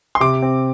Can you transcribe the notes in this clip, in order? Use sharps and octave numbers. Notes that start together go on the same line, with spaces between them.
C6
C3 D6
C4